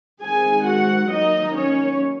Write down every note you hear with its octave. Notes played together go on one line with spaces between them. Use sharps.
D#3 G#3 C4 G#4 G#5
F#4 F#5
D#3 F#3 A#3 D#4 D#5
C#4 C#5